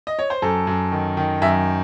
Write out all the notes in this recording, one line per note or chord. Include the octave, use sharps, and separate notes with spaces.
D#5
C#5
C5
F#2 A4
F#2
D#3
D#3
F#2 E5